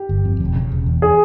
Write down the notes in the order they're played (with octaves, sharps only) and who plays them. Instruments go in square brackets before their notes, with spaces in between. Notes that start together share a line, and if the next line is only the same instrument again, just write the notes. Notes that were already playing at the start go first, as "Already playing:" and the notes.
Already playing: [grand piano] G4
[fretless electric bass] G1
F2
E1
C#3
E1
E2
[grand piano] G#4